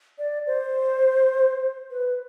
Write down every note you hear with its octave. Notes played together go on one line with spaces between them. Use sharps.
D5
C5
B4